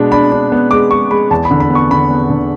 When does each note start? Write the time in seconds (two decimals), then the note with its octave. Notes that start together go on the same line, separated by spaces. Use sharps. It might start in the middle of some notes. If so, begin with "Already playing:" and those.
Already playing: B2 G#3 B3 D4
0.11 D4 B5
0.32 D4
0.52 B3
0.71 G#3 D6
0.91 G#3 C#6
1.11 G#3 B5
1.31 E2 A5
1.45 B5
1.51 D3
1.60 B5
1.70 B3
1.75 C#6
1.91 D3 B5
2.11 B3
2.30 D3